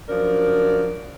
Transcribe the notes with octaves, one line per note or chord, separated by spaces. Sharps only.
F#2 F3 D4 A#4 D5